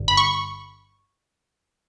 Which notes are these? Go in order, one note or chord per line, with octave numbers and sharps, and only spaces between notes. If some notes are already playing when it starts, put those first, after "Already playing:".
Already playing: G1 G2 D3
B5
C#6